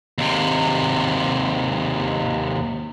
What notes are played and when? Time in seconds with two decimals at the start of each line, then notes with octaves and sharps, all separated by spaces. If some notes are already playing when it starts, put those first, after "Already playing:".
0.18 D#2 C3